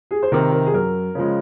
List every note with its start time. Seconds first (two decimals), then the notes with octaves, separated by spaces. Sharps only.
0.11 G#4
0.23 C5
0.32 C3 D#3 A#4
0.52 A#4
0.66 G#4
0.74 F#2 A#4
1.15 C#3 F3 G#3